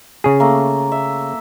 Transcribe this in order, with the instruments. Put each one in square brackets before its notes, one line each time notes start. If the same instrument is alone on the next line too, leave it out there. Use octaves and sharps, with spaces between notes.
[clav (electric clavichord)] C#3 G#4
[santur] A3 A#3
E5